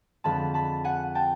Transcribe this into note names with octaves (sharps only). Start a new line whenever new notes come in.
F2 D3 F3 G#3 A5 B5
A5 B5
F#5 G#5
G5 A5